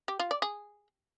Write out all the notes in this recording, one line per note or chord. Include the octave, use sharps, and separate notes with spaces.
G4
F4
D5
G#4